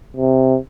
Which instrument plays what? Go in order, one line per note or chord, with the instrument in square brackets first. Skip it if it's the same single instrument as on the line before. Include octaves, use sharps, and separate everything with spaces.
[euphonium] C3